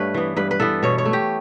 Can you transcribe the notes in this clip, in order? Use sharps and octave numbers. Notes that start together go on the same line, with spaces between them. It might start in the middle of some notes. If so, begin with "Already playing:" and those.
Already playing: G2 A3 B4 C#5
E3 B3
G2 B4
B4
E3 B3 A4
B2 C#5
C#5
A3
G4